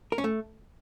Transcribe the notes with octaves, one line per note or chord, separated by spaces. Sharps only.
A#4
C#4
A3